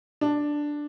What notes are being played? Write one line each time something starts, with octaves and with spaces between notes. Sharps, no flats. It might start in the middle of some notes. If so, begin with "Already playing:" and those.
D4